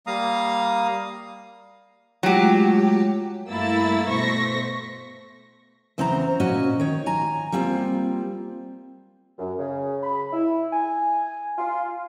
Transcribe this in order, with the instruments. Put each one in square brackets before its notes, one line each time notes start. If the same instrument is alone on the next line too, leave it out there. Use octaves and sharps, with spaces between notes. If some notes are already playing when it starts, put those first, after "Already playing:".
[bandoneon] G3 A#3 F5 A#5 D#6
[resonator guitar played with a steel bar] F#3 G4 [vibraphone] G#3 A3 F4
[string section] G2 A3 A#3 E4 E6 A6
B2 A3 C5 C#6 A#6 B6
[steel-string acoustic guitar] E2 C#3 C4 C5 A5 A#5
A#2 C#4 F#4 D#5
D#3 C#5
G#5 A#5
G3 A#3 C4 F4
[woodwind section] F#2
C#3
B5
E4
G#5
F4